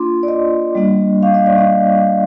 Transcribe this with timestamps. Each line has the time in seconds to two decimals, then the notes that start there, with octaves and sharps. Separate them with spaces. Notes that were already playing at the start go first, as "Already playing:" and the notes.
Already playing: A#3 D4 F4 C6 D6
0.23 D5
0.28 D#5
0.75 G3 A#3 D4
1.23 F5
1.34 D#5
1.46 D5
1.58 D#5